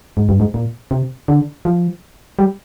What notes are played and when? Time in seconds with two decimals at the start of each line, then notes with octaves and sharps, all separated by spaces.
0.17 G#2
0.29 G2
0.40 G#2
0.54 A#2
0.91 C3
1.28 D3
1.65 F3
2.39 G3